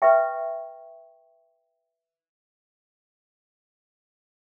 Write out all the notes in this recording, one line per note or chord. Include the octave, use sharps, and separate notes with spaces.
B4 E5 G5 C#6